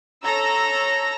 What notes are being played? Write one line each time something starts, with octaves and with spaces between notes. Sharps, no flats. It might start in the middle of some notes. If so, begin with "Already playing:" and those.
A4 C#5 A#5 E6 A#6